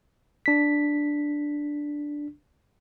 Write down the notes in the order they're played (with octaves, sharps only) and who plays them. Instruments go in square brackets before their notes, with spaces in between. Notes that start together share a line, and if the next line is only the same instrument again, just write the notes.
[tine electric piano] D4 B6